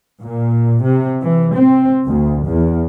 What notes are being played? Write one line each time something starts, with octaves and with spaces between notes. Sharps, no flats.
A#2
C3
E3
C4
D2
E2